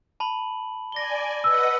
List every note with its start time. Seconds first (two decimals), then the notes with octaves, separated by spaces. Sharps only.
0.20 A5 B5 F#7
0.92 D5 G#5 A#6 G7
1.44 B4 D#5 F#5 E6